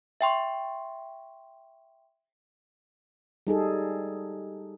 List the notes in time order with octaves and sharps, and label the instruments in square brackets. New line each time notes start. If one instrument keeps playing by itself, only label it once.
[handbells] E5 G5 C6 C#6
[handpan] G3 D#4 G#4 A4